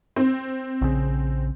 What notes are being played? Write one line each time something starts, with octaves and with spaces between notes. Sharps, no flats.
C4
A#1 C#3